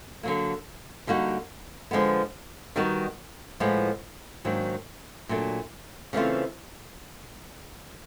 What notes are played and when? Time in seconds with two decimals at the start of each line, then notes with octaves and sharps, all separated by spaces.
0.23 D3 F#3 A#3
1.07 D3 G3 A#3 D#4 F#4
1.91 D3 F3 G#3 B3
2.76 D#3 G3 B3 D#4 F#4
3.60 A2 F3 G#3 B3
4.45 G#2 D#3 F#3 A#3 D4
5.29 A#2 F#3 A3 D4
6.13 C#3 E3 A3 C4 F4